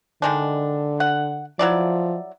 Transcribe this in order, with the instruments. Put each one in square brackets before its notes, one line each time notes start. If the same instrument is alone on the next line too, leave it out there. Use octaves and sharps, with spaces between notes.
[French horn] D3 [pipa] D#3 G#3 D4
[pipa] F#5
[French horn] F3 [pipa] F#3 E4 D5